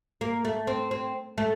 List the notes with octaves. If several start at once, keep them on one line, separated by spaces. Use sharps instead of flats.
A#3
A3
C4
C4
A3